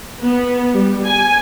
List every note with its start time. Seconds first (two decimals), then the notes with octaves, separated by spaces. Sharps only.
0.22 B3
0.74 G3
1.06 G#5